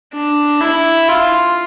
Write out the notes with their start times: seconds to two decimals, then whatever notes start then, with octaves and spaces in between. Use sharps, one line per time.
0.14 D4
0.61 E4
1.08 F4